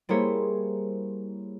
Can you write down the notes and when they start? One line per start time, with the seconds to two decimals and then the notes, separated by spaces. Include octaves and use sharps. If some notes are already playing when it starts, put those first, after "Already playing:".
0.09 G3 A#3 E4 G#4 C5 C#5